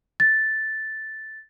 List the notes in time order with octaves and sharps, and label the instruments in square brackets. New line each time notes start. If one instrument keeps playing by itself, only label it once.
[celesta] A6